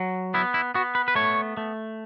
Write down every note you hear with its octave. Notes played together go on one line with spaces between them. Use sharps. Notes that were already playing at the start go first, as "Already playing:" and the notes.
Already playing: F#3
B3 E4
E4
B3 F#4
B4
B4
A3 C#5
A3